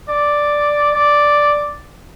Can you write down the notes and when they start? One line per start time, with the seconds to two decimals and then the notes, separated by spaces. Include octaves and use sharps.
0.08 D5
0.94 D5